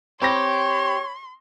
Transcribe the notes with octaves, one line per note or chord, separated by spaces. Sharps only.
C4 G4 C#5 B5 C6 A#6